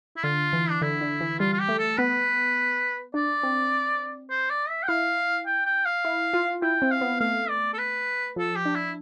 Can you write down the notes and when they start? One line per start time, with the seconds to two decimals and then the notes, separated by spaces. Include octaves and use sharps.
0.17 E4
0.24 D3 F4
0.53 E3
0.70 D4
0.82 D3 E4
1.01 D3
1.21 E3
1.39 G3 F4
1.53 F4
1.59 G4
1.68 A3
1.78 A4
1.97 B3 B4
3.14 D4 D5
3.43 C4
4.30 C5
4.50 D5
4.69 E5
4.83 G5
4.88 E4 F5
5.46 G5
5.66 G5
5.85 F5
6.05 E4
6.34 F4
6.62 E4 G5
6.82 C4
6.91 F5
7.01 B3
7.20 A3 F5
7.49 D5
7.73 A4
7.78 B4
8.36 F3 A4
8.56 G4
8.66 D4
8.75 E4